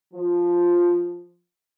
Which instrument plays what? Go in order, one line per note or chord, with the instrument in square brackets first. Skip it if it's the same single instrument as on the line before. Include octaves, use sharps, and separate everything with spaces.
[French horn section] F3